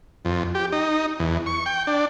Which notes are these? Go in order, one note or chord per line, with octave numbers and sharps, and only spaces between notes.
F2
G4
D#4
E2
C#6
G5
D4